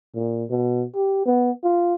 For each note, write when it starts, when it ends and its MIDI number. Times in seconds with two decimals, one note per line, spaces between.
0.15 0.45 46
0.50 0.84 47
0.95 1.24 67
1.26 1.51 59
1.63 1.95 65